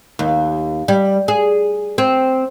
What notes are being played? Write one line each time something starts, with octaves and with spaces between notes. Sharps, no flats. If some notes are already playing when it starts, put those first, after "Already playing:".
D#2
G3
G#4
C4